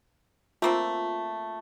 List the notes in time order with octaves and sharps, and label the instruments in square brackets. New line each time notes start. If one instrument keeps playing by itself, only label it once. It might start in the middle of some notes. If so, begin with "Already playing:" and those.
[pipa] A3 A#3 C4 [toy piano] F4